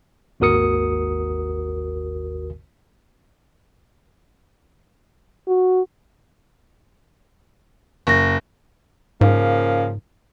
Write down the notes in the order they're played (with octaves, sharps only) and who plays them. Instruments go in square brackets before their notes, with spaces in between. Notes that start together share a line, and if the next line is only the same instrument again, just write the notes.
[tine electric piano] G#1 D#2 F#4 A#4 D#6 C#7
[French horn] F#4
[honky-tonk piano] F#1 [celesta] C#6 A#6
[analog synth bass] G#2 [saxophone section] C#3 F3 A#3